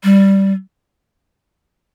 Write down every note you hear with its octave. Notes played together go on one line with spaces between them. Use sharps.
G3